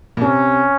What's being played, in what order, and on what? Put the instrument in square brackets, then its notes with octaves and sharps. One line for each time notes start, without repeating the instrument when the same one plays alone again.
[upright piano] A#2
[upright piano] C3 [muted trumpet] C#4